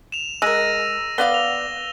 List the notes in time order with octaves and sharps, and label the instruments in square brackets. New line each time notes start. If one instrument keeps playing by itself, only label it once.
[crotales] E7 F7
[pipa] G#3 A#4 [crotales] E6 A#6 D#7
[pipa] B3 D5 F5 [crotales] G7
[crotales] F7